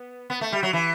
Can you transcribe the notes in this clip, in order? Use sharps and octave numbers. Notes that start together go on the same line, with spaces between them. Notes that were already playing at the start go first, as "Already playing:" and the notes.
Already playing: B3
B3
A3
G3
F#3
E3